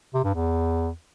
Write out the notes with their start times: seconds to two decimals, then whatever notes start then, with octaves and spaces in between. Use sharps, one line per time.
0.14 C3
0.24 G2
0.34 E2